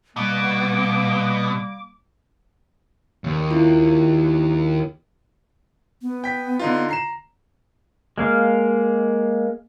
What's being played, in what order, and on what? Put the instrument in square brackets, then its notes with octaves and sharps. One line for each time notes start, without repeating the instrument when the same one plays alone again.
[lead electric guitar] B2 [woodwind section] G3 A#3 [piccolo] D6
[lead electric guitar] D#2
[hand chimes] E4 F4
[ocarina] B3
[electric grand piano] G5 B6
D3 D#4 F4
A#5 C7 E7
[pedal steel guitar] G#3 A#3 F5